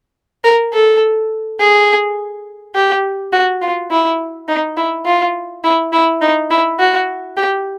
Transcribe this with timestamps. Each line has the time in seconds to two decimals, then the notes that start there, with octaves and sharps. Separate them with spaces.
0.44 A#4
0.73 A4
1.60 G#4
2.75 G4
3.33 F#4
3.61 F4
3.90 E4
4.48 D#4
4.77 E4
5.06 F4
5.64 E4
5.93 E4
6.21 D#4
6.51 E4
6.79 F#4
7.37 G4